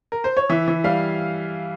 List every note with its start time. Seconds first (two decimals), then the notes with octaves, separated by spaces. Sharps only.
0.12 A#4
0.24 C5
0.37 C#5
0.49 E3 E5
0.68 E3
0.84 G3 F5